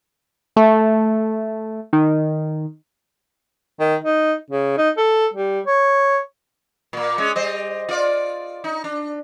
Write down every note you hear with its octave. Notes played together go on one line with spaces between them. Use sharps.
A3
D#3
D#3
D#4
C#3
D#4
A4
G3
C#5
A#2 A#3
G#3 C#4
G3 C5 D#5
F4 D5
D#4
D4